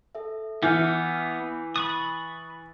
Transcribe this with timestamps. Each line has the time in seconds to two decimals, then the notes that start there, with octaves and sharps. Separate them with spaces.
0.15 A4 E5
0.63 E3 B3 D6 F6 G6 C#7
1.76 B5 C#6 D#6 F#6 A6